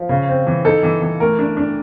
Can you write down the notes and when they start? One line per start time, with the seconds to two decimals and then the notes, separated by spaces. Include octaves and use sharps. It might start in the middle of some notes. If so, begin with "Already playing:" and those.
Already playing: F3
0.09 C#3
0.29 C4
0.47 E3
0.65 D#4 A4
0.83 E3
1.02 E3
1.20 A3 A#4
1.39 D4
1.57 D4